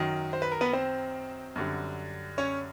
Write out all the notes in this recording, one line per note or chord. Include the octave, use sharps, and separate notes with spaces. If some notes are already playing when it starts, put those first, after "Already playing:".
Already playing: F#2 D#3 F#3
C5
B4
A#4
B3 B4
C4 C5
F#2 D3 G3
C#4 C#5